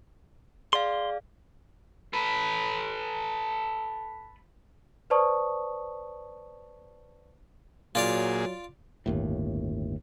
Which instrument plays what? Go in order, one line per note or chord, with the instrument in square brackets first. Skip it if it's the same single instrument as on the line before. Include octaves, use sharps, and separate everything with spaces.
[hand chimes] G#4 D5 F5 [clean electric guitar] C6
[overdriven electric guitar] A4 B4
[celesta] B4 C5 D5 A5 C#6 D#6
[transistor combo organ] A#2 G#4 [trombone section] F#3 [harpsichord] F4 D5 F5
[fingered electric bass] G1 D#2 A2